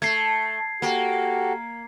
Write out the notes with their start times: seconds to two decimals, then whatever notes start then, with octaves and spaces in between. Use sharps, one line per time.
0.02 A3 G#6 C7
0.82 A#3 F#4 G4 A4